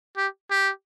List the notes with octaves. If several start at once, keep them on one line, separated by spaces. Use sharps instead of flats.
G4
G4